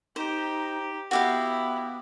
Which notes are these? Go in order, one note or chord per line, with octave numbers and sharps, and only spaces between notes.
D#4 G4 C5
B3 E4 F#4 G4 F5